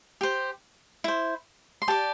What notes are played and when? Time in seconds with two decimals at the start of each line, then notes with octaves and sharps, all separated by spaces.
0.21 G4 C5
1.04 E4 C5
1.82 C6
1.88 G4 D5 A5